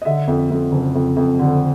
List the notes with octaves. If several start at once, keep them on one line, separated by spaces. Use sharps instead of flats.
D#5
D3 E5
F2
F2
F#1
F2
F2
D3